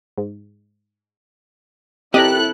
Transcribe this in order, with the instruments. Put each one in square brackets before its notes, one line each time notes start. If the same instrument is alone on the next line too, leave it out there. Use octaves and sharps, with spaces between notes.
[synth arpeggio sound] G#2
[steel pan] C4 [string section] E4 A4 F#6 [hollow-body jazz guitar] G4 [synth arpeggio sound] A#4 D5 D#5